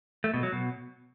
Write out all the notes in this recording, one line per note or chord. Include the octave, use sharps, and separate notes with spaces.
A3
B2
F#3
B2